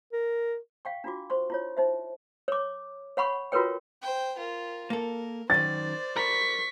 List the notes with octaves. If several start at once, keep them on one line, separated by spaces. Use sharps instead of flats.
A#4
F5 G5 C#6
D4 F4 F#4 D6
C5 C6 C#6
E4 F4 C#5
D#4 C5 E5
C#5 D6
C#5 F#5 B5 C#6
F4 F#4 A#4 B4 C#5 G5
C5 G5
F4 A#4
A#3 A4 A#4
F#2 D#3 C5 D5 A6
A#4 A#5 B5 C#6 B6